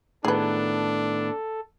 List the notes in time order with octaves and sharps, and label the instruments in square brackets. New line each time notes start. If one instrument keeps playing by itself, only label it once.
[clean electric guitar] A2 D#3 B3 [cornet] D4 [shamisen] G#4 B4 [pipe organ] A4